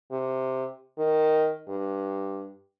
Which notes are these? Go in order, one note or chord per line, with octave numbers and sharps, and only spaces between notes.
C3
D#3
G2